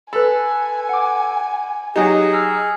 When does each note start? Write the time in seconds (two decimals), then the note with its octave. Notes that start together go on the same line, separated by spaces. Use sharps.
0.13 A4 B4 G#5 B5
0.89 F#5 D6
1.96 F#3 D#4 G4 G#4
2.33 E6 F6